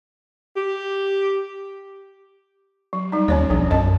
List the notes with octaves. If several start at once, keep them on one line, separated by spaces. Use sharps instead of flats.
G4
F#3
G3 D#4
D#2 C#4 C#5 D5
B1 F3 D4
F#2 D#5 A5